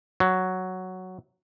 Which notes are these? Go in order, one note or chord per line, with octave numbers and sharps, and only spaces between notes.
F#3